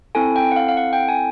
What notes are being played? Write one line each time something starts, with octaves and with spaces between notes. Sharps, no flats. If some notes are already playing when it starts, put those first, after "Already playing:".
C4 E4 A4 G#5
G5
F#5
F5
F5
F#5
G5
G#5